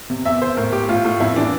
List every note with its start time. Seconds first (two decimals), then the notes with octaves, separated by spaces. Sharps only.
0.10 C3
0.25 E2 E5
0.42 E2 C5
0.57 A2 A#4
0.72 A2 G4
0.89 A2 F4
1.05 A2
1.20 F2 E4
1.36 E3 D4